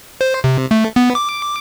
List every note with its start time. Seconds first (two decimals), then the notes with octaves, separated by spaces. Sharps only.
0.21 C5
0.44 C3
0.71 A3
0.96 B3
1.15 D6